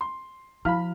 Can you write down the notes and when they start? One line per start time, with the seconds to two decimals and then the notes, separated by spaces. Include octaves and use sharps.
0.01 C6
0.65 F3 E4 F#4 F5 B5 F6